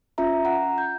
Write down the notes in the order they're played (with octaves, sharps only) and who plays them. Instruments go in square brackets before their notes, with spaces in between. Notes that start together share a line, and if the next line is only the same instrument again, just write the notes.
[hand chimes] C#4 F4 E5 A#5
F#5 A#5
G6